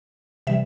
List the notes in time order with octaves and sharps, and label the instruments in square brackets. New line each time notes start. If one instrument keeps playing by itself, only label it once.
[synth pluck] C3 E3 G3 E5